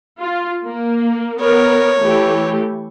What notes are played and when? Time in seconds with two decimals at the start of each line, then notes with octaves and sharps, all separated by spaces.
0.21 F4
0.65 A#3
1.41 B3 A#4 C#5
2.01 E3 A3 G4